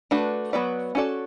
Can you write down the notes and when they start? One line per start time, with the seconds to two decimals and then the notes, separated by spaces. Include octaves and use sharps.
0.11 A3 D4 F#4 B4
0.53 F#3 B3 F#4 B4 D5
0.95 C#4 F#4 A4 D5